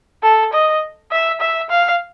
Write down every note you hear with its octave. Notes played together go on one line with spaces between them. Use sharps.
A4
D#5
E5
E5
F5